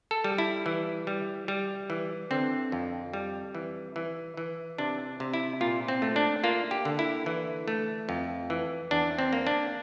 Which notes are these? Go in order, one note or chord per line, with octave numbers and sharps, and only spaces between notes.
A4
G3
E4
E3
G3
G3
E3
D3 C4
F2
G3
E3
E3
E3
C3 D4
C3
E4
A#2 F4
C4
A3
D4
A#3 F4
G4
D3
E4
E3
A3
F2
E3
E2 D4
C4
A#3
D4